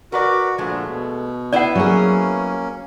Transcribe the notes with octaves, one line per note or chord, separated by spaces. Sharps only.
F#4 A#4 B4 D5
A#2 D3 F3 G#3 A3
B2
B3 E4 B4 D5 F#5
F#3 A#3 C#4 G#4